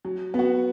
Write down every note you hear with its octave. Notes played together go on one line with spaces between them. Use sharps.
F#3
B3
F#4